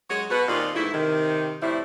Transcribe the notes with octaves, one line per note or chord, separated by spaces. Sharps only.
F#3 G#3 F#4 C#5
B2 F#4 B4
D#2 A#2 C4 F4 D5 D#5
G#2 E3 A3 E4
C3 D#3
F2 A2 C3 G3 E4